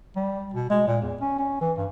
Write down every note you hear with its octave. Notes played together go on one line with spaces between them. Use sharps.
G3
B2
G#3
A#2
E2
C#4
C#4
E3
G2